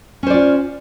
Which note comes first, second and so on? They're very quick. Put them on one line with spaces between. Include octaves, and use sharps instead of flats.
C#4 C5 D5 F4